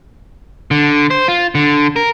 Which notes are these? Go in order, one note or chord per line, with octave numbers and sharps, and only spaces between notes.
D3
C5
F4
D3
A#4